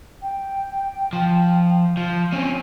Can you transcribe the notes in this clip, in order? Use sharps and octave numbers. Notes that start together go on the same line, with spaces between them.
G5
F3
F3
C4 C#4